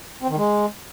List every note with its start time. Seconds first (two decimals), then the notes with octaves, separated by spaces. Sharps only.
0.22 C4
0.29 D#3
0.37 G#3